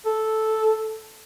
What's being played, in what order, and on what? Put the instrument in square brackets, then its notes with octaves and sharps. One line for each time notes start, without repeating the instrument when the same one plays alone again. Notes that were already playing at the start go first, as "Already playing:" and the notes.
[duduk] A4